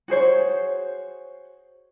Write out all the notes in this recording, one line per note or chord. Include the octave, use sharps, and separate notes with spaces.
F#4 G#4 C5 C#5